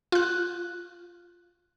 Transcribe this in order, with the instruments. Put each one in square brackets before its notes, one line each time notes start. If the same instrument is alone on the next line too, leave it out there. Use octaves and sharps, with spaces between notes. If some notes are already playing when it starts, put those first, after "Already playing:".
[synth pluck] F4 F#6